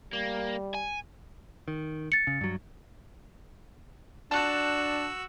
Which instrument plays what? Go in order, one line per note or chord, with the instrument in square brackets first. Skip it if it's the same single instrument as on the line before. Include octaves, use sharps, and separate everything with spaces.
[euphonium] G3 [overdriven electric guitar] A#3
[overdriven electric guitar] G#5
[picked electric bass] D#3
[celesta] A6 C#7
[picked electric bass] C#3
G2 F#3
[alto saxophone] D4 [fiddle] F#4 E6 [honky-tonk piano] A5 F#6